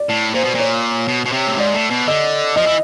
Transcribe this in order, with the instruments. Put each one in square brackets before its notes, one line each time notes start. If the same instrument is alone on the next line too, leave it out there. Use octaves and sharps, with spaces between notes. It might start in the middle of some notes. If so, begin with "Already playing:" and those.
Already playing: [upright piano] D5
[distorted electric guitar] A2
[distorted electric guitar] A#2 [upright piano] C5
[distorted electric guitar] B2
[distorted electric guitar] A#2 [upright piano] C#5
[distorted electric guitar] B2
B2
C3
A2
[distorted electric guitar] G#2 [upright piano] D5
[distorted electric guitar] A2
B2
[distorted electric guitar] D3 [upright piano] D#5
[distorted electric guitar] F3 [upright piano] D#5
[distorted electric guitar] E3